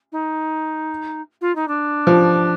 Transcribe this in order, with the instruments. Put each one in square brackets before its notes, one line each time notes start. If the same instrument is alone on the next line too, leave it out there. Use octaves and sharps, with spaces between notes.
[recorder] D#4
F4
D#4
D4
[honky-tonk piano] F3